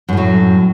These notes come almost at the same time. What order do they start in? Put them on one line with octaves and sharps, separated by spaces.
F#2 A2 F#3